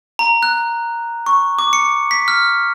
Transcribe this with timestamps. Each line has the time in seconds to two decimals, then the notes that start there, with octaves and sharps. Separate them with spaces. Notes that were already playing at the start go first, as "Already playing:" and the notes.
0.19 A#5
0.43 F#6
1.26 C#6
1.59 D6
1.73 C#7
2.11 B6
2.28 F6